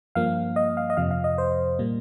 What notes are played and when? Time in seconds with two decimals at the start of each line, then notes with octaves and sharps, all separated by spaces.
0.15 G2 F3 A#3 F5
0.56 D#5
0.77 F5
0.90 D#5
0.97 F2 C3 F3 F5
1.11 F5
1.24 D#5
1.38 C5
1.79 A#2 G3 A#3